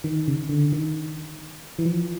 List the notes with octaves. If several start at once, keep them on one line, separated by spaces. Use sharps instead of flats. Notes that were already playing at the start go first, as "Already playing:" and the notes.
D#3
C#3
D3
D#3
E3
F3